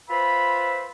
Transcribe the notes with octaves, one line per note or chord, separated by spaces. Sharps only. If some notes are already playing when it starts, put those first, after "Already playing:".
F4 B4 C5 E5 B5